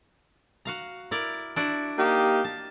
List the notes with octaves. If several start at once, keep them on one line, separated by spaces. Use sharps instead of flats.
F#4 F5 A#5
E4 A#4 D5
D4 E4 F#4
A#3 D#4 G4
A5